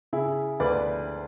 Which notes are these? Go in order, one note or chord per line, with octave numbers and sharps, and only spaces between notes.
C#3 E4 G#4
D2 B4 D5